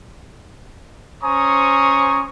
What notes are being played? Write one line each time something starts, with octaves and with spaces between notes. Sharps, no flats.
C#4 C5 G#5 A#5 C#6 D#6